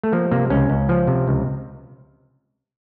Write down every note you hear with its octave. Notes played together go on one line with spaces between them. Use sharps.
A3
F3 A#3
C3 A#3
C#2 C#4
C#2
F3
C3
C#2